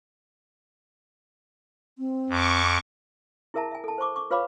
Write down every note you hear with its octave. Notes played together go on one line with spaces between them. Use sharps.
C4
F2 C#6 D6
E4 G#4 A#4 E5 A5 A#5
E5 G#5
A4 A5
C5 A5 C#6 D6
C#6 D6
F4 B4 C#5 F5 B5 D6